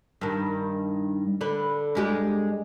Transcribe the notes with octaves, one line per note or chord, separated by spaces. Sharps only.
G2 D#3
D3 B4
G2 G#3 G4